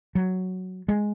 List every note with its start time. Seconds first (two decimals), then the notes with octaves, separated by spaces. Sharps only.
0.15 F#3
0.88 G#3